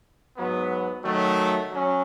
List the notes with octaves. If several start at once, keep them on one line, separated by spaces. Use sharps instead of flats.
G#2 F#3 B3
D#3 F#3 A3
F#3 C#4